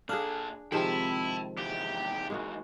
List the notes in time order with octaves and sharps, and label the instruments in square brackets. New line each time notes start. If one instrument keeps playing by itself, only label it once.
[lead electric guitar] A#2 A5 [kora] D4 G#4 [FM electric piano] A4 F5 F#6
[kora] C3 D#3 F3 [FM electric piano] G#3 C4 [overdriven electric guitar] E4 [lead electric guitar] G5 A5
[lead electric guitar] D#2 E3 [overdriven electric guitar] G4
[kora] G#3 A#3 F#4